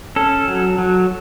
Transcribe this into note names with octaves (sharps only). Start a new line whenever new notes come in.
C#4 A4
F#3
F#3